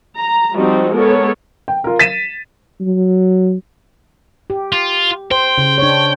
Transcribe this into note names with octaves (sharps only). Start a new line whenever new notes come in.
A#5
F3 G3 C4 D#4 F#4
G#3 B3 A4 A#4 C#5
G5
F4 A#4
A6 B6 D#7 E7
F#3
G4
F4
C5 G5
C#3
D4 C#5